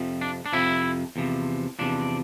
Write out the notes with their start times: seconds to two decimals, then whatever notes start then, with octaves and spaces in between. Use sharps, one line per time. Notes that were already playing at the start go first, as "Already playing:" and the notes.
Already playing: F2 C3 F3
0.21 D4
0.46 D4
0.53 F2 C3 F3 E4
1.16 E2 C3 F3
1.79 E2 C3 F3 D4